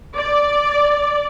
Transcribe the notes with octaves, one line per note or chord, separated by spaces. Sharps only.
D5